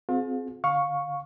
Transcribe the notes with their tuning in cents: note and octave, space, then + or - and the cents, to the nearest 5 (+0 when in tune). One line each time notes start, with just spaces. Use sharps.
C4 -10 F4 +40 G#4 +30
D3 +0 F5 +20 C#6 +0